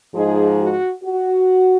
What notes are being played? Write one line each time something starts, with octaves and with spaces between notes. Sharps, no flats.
G#2 F3 G#3 D#4 G#4
F#4
F#4